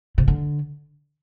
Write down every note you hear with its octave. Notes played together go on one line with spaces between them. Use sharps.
C3
D3